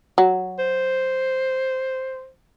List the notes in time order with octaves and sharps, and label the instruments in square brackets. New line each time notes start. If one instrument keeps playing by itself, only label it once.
[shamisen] F#3
[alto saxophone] C5